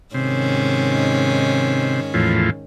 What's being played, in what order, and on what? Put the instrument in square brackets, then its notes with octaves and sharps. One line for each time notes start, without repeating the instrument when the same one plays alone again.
[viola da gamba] G#2 D#3 C#4 [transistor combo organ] C3
[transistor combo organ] E2 A2 F3